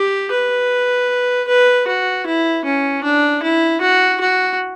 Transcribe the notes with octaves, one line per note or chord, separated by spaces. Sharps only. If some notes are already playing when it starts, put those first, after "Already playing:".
Already playing: G4
B4
B4
F#4
E4
C#4
D4
E4
F#4
F#4